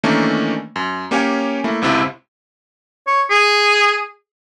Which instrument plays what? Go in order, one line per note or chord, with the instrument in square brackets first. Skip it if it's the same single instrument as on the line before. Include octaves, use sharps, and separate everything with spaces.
[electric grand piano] D#3 E3 A3 A#3 C#4 D4
F#2
A#3 C#4 G4 C#5 F5 G#5
A3 A#3 E4
G1 C#2 C3 C4 E4
[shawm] C#5
G#4